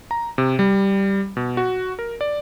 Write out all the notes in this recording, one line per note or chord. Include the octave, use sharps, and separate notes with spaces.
A#5
C3
G3
B2
F#4
A#4
D5